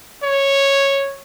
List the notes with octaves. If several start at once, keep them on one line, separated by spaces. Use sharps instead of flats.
C#5